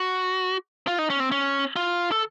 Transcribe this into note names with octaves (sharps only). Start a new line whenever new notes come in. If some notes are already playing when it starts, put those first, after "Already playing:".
Already playing: F#4
F4
D#4
C#4
C4
C#4
F4
A4